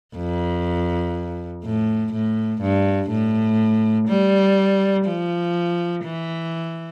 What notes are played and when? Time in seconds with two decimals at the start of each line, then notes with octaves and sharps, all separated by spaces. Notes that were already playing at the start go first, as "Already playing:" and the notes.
0.16 F2
1.64 A2
2.13 A2
2.61 G2
3.10 A2
4.08 G3
5.07 F3
6.04 E3